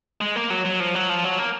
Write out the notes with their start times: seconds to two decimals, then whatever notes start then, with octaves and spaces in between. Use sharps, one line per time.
0.21 G#3
0.36 A#3
0.50 F#3
0.65 F#3
0.80 F3
0.95 F#3
1.09 F3
1.24 F#3
1.38 A#3